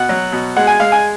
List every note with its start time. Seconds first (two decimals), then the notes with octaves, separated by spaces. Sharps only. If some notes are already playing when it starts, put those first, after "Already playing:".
Already playing: B2 F#5
0.09 F#3
0.32 B2
0.57 G#3 F#5
0.67 G#5
0.80 G#3 F5
0.92 G#5